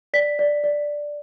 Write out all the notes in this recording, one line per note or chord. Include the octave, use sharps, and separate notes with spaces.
D5 B6
D5
D5